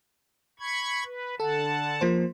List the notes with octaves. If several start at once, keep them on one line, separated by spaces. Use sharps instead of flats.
B5 C#6 G#6
B4
D3 A4 F#5 A5
F3 A#3 C5